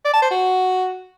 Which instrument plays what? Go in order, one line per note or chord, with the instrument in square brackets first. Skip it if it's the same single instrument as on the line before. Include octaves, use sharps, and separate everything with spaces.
[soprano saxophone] D5
A5
C5
F#4